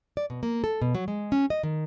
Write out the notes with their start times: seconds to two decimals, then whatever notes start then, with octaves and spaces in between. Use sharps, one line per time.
0.17 D5
0.30 B2
0.43 A#3
0.64 A4
0.82 B2
0.95 F#3
1.08 G#3
1.32 C#4
1.50 D#5
1.63 D#3